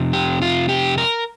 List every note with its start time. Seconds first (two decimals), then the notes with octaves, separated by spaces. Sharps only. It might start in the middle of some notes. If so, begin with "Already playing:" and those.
Already playing: F2 C3
0.13 G4
0.42 F4
0.69 G4
0.98 A#4